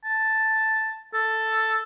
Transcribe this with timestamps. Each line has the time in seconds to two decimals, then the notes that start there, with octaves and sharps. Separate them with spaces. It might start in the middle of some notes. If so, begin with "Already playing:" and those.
0.05 A5
1.14 A4